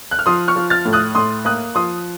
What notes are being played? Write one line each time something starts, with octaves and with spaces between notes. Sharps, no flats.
F#6
F6
F3 C6 D#6
C#6 F6
F3
F6 A6
A2
D#6 F#6
A2 C6 D#6
A#3 D#6 F#6
F3 C6 D#6